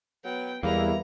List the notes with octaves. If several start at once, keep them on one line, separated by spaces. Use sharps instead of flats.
F#3 B3 G5
E2 G3 G#3 A#3 B3 E4 A#5